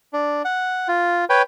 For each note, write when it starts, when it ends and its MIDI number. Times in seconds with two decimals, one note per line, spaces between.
0.13 0.42 62
0.45 0.88 78
0.88 1.25 65
1.30 1.42 71
1.30 1.42 73
1.30 1.42 79